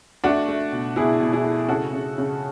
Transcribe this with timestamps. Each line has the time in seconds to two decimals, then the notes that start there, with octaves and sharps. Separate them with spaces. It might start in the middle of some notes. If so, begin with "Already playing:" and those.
0.24 A3 D4 F#4
0.48 A3
0.72 B2
0.96 B2 E4 G#4
1.20 B2
1.33 E4 G#4
1.45 A3
1.69 C#3 F#4 A4
1.93 C#3
2.18 C#3